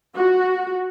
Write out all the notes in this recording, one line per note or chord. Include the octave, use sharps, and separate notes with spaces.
F#4